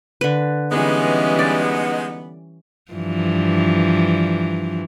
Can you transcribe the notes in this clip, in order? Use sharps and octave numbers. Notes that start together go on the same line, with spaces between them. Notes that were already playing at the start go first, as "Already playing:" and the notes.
D3 B4
E3 G3 G#3 B3 C#4 D#4
D5
G2 E3 F3